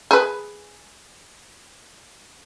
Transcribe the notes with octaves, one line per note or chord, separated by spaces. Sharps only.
G#4 B4